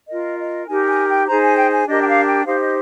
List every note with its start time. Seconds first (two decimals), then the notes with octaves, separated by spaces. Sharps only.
0.08 F4 A#4 D#5
0.38 D#5
0.69 D#4 G4 A#4 G#5
0.87 G#5
1.08 G5
1.27 D#4 G#4 C5 A#5
1.43 G#5
1.57 G5
1.72 G#5
1.87 D4 G4 A#4 D#5
2.01 G5
2.07 F5
2.27 G5
2.46 D#4 G4 C5 F5
2.61 D#5